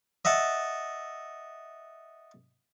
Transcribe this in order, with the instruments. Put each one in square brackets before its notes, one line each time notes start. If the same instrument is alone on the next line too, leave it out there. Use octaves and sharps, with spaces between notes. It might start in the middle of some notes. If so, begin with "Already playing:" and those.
[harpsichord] D#5 E5 F#5 A5